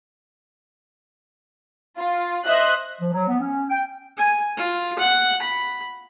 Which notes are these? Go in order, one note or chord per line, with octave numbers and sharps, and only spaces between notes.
F4
C5 D#5 E5 F#6
F3
F#3
B3
C#4
G5
G#5
F4
F#5
B5